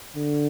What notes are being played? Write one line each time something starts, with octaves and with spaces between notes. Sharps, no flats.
D3